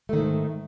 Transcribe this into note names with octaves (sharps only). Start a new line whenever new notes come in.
G#2 D#3 A3